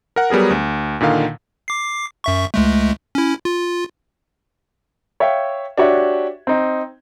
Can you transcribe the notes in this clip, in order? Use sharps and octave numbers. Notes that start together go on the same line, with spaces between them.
A#4 F#5
F#3 G3 B3 G#4 A#4
D2
A#2 D3 D#3 F5
D6 C7
F#2 E5 C#6
C#2 G#3 A3
C#4 E4
F4
C#5 E5 F5 G5
D4 F#4 G4 C#5 E5
C4 D#4